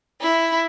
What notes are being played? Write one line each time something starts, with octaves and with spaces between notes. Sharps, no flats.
E4